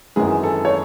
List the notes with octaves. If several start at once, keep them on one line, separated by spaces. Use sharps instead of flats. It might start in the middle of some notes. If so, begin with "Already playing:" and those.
G#1 F#2 E3 G#3 G#4
A4
C#5